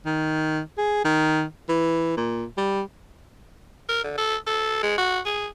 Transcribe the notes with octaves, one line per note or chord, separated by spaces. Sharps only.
D#3
G#4
D#3
E3
A#2
G3
A#4
D3
A4
A4
G#3
F#4
G#4